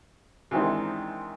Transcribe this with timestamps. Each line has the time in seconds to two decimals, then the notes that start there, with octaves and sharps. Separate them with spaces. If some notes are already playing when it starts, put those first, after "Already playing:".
0.51 G#2 C3 D#3 E3 C4 D4